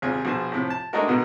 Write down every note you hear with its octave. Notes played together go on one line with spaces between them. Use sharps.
G#1 D#2 C3 F4 G#4
A#1 B2 G#4 C5 A5
A2 C3 F3
A5
G#3 A3 D4 D#4 F#4 A#4
B2 D3 D#3 G#3 B3